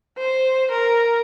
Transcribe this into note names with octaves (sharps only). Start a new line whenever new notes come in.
C5
A#4